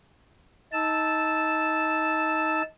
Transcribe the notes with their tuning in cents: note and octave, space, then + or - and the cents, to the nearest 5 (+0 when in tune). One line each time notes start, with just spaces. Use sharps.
D#4 +20 A5 +0 E6 -5